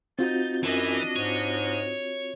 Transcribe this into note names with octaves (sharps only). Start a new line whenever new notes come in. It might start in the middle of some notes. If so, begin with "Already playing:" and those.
C4 D#4 F4 F#4 G6 A6
F#2 E3 D4 D#5
G#2 C#5